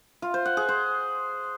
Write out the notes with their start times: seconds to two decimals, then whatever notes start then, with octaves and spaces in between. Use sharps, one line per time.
0.22 F4
0.34 C5
0.45 F#5
0.57 G#4
0.69 C5